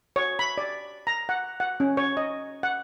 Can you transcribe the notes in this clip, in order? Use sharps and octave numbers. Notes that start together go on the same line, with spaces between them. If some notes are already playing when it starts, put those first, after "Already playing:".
C#5
B5
D5
A#5
F#5
F#5
C#4
C#5
D#5
F#5